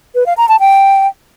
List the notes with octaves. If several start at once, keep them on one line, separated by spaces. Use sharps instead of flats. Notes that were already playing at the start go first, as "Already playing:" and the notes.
B4
F5
A#5
A5
G5